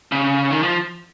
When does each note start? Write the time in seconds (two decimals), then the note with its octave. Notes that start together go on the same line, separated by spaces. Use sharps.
0.12 C#3
0.50 D#3
0.63 F3